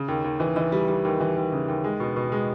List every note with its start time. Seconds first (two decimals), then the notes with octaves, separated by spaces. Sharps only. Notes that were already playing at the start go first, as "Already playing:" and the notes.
Already playing: C#3
0.08 D#2
0.24 D#2
0.40 E3
0.56 E3
0.72 G3
0.88 G3
1.05 D#2
1.20 E3
1.36 D#2
1.52 C#3
1.68 D#2
1.84 G#3
2.00 B2
2.16 B2
2.32 G#3